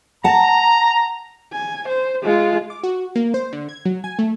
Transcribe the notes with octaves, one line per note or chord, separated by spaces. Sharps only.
F#5 A5 A#5
G#5
C5
G#3 F4
D6
F#4
A#3
C5
D3
G#6
F#3
G#5
A3